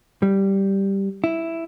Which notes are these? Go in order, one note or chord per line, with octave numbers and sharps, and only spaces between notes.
G3
E4